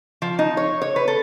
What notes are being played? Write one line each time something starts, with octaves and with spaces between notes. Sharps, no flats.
F3
D#4
C#5
C#5
B4
A4